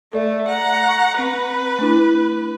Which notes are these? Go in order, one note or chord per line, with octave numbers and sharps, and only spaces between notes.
A3 A4 D5 E5
F#5 A#5
C#6
C4 B4
A3 D4 E4